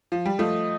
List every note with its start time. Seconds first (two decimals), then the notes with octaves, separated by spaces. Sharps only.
0.12 F3
0.26 G3
0.39 F3 A3 D#5